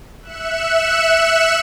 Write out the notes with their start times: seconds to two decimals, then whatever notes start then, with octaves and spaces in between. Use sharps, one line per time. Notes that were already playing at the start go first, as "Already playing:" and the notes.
0.22 E5 F#6 C#7 E7